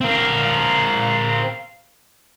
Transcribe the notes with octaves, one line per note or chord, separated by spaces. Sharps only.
C4 A#4 F5